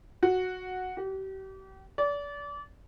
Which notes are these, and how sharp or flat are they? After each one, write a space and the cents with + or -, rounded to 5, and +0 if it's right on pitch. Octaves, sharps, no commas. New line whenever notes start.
F#4 -5
G4 -35
D5 -30